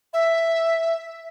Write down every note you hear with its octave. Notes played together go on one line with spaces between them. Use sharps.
E5